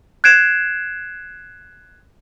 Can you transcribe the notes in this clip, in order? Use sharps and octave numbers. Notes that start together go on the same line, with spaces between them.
F#6 G#6 C7 D7 E7